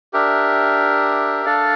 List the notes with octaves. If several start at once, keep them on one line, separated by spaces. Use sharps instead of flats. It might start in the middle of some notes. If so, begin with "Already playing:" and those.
D4 G4 A#4 E5
D4 A4 D5 F5